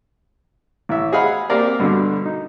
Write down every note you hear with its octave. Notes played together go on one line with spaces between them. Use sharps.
A1 E5
G#4 C5 D#5 F5 F#5 B5
A#3 C4 G4 A#4 D5
G2 B2 D3
D#4